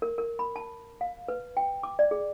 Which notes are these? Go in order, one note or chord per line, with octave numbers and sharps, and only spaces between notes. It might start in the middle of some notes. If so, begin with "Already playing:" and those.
A#4
A#4
B5
A5
F5
B4
G5
D6
D5
G#4